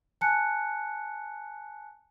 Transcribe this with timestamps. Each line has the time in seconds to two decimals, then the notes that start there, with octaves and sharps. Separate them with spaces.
0.21 G#5 A5 F#6 C#7